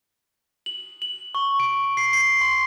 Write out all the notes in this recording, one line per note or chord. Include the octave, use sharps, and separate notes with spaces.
F#7
F#7
C#6
D7
C7
C7
C6